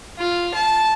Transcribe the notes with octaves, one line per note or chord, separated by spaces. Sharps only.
F4
A5